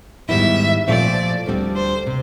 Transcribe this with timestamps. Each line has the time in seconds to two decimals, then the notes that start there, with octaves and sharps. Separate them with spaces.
0.28 G#2 D#3 G3 B3 E4 E5
0.88 A#2 F3 A3 C4 F4 D5
1.46 D2 D3 G3 C4
1.75 C5
2.07 C3